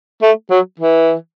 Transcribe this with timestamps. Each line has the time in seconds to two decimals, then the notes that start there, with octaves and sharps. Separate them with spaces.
0.22 A3
0.50 F#3
0.79 E3